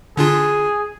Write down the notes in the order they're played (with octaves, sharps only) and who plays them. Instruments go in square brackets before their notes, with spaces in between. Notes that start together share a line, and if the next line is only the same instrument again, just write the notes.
[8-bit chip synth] D3 D4 F4 [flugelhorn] G#4